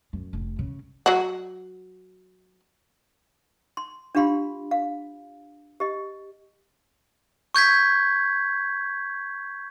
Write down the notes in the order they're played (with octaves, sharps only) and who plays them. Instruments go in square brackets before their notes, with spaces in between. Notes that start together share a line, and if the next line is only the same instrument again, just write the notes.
[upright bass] F#2
F1
C#3
[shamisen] F#3 F#4
[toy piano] C6
D4 F4 G4 F5 B5 C6
F5
G4 D#5
[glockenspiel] C#6 G6 G#6 B6